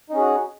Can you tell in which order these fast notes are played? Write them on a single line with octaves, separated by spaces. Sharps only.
D#4 C#4 G#4 F#4